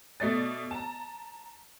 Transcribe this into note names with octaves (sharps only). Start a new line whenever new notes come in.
B2 A3 D5 A6
A5 A#5